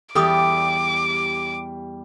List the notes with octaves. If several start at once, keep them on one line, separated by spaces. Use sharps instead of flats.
E2 G3 G4 A4 D5 D6 D#6